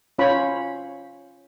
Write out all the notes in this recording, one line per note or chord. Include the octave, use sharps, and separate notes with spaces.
C#4 F4 C5 C#5 B5